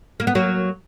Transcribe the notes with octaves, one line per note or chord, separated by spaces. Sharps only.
A#3
B3
F#3 A#3